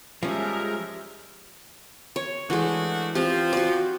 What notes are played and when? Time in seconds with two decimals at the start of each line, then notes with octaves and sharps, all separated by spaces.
0.23 F3 G3 G#3 C#4 A#4 E5
2.16 C#5
2.50 E3 G#3 A3 D4 F#4
3.15 F3 C4 G4
3.53 F#4 D5